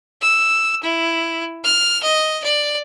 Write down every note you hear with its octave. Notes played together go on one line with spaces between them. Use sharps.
E6
E4
F6
D#5
D5